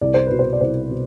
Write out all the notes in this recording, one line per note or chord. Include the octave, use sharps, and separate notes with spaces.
C2 D5
C5
B2 B4
C5
D5
C2 C5
B2